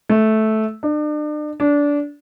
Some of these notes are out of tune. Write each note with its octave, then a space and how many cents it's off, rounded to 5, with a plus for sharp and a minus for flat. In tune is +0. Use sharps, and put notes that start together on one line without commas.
A3 -10
D4 +40
D4 -20